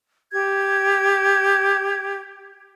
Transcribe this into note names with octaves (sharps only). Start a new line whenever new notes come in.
G4 G#6